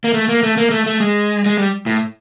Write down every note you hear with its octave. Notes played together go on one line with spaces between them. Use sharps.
A#3
A3
A#3
A3
A#3
A3
A3
G#3
G#3
G3
A2